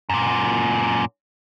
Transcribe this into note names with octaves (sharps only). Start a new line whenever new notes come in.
F#2 A#2